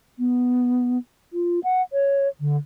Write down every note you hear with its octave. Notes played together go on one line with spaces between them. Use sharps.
B3
F4
F#5
C#5
D3